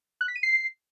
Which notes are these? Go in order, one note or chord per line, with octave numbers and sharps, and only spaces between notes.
F#6
B6
D#7
C7